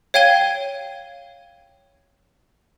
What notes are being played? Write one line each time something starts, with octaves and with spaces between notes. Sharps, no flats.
C#5 F5 G5 G#6 D#7 G7